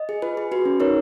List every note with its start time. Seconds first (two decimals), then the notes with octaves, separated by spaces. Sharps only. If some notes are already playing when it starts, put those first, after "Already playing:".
Already playing: D#5
0.09 G#4
0.22 F4 B4
0.37 G#4
0.52 F#4 B4
0.65 C#4
0.80 D#4 A#4 C#5